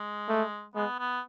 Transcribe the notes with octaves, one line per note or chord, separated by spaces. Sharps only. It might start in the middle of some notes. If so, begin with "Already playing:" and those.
Already playing: G#3
A3
G#3 B3
B3